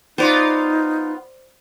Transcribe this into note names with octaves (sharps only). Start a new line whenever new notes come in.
B3 D#4 F4 C5 D5 A#5